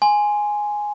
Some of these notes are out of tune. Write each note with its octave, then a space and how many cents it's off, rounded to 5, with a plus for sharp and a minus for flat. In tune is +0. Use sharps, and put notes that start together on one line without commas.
G#5 +0 C6 +0